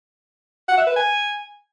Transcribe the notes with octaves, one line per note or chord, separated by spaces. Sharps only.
F#5
E5
B4
G#5